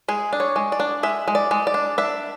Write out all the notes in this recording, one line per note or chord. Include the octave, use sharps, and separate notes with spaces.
G#3 G#4
D4
C#5
G#3
D5
D4
G#3 E5
G#3
D5
G#3
D5
D4
D4 E5